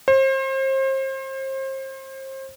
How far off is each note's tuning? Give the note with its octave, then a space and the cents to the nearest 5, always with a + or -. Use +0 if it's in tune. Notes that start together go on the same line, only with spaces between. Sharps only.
C5 +35